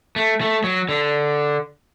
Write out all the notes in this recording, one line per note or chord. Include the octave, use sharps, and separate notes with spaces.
A3
A3
F#3
D3